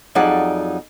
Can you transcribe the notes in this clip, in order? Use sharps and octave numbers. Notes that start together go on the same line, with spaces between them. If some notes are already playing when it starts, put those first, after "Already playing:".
F2 F#3 D#4 G#4 D5 F#5